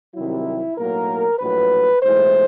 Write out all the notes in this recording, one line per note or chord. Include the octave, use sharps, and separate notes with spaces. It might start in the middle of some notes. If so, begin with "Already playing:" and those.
C2 C3 D#3 F#3 E4
B1 A2 F#3 A#3 A#4
A#1 A2 F#3 B4
B1 A2 E3 G#3 C5